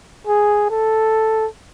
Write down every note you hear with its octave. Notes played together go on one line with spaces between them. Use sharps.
G#4
A4